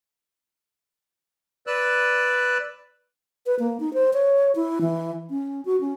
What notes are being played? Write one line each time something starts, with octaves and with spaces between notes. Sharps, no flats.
B4 D5 E6 F#6
B4
A#3
D#4
C5
C#5
E4
E3
C#4
F#4
C#4